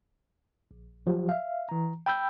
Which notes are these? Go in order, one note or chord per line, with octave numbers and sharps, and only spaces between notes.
A#1
G1 F3 F#3 G4
E5 F5
E3 A#5
G5 B5 E6 G6